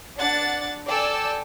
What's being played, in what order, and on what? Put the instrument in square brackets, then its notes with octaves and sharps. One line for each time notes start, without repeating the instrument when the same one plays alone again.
[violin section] D4 D5 F#5 A6
A4 D5 G5 G#5 D6 E6